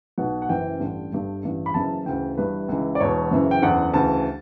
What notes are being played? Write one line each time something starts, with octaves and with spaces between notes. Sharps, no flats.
B1 B2 F#5
F#5
F#1 F#2 E3 G5
A1 G2 D3
G1 G2 D3
A1 G2 E3
B5
F#1 F#2 C#3 E3 A5
D2 C#3 E3 G5
G1 G2 E3 B4
C#2 C#3 E3
D5
E1 E2 B2 C#5
F#1 F#2 C#3 E3
G5
F#1 E2 D3 F#5
D2 C#3 E3 A5